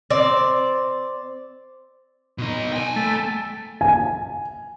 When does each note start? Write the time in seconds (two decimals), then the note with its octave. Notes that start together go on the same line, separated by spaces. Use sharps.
0.10 C4 D5
2.38 B2 D#4
2.73 G5 G#5
2.96 A3
3.81 G#5